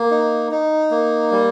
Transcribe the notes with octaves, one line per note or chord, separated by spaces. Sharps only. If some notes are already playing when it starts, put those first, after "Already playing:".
Already playing: A#3
D#4
D#4
A#3
G3